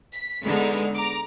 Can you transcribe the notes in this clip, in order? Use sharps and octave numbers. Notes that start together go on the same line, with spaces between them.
B6
D3 G#3 B3 D#4
A#5 D6